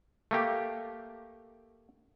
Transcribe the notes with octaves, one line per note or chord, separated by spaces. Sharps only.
A3 A#3 G4